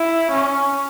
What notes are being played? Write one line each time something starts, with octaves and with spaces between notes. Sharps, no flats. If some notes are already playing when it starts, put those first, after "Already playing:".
Already playing: E4
C#4